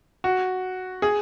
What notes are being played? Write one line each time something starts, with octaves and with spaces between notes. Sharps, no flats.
F#4
G#4